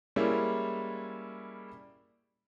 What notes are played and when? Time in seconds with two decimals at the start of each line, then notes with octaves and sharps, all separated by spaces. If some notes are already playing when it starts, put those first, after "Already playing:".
0.16 G3 G#3 A#3 C#4 E4